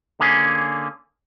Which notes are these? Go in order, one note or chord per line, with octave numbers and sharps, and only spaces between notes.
D3 A#3 C#4 G#4